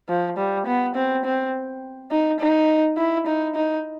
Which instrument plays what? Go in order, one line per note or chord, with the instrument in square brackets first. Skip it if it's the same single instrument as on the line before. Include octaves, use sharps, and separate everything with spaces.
[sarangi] F3
G3
B3
C4
C4
D#4
D#4
E4
D#4
D#4